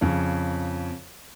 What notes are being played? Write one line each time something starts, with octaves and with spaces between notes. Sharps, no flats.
F2 C#3 C#5